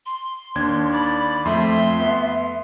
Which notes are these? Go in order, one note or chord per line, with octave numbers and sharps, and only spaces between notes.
C6
D#2 D4 G#6
D5 B5
F2 A3 E5 C6
B3